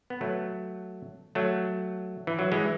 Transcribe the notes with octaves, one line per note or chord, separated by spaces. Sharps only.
B3
F#3 A3
F#3 A3
E3
F#3
E3 G#3